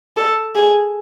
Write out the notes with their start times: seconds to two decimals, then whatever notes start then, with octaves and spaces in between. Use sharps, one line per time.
0.17 A4
0.55 G#4